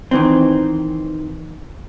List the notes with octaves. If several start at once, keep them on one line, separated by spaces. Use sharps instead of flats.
D#3 E3 C4